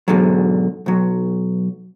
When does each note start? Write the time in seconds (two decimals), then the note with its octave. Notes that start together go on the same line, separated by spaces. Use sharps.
0.08 G#2 B2 D3 F#3
0.86 B1 F#3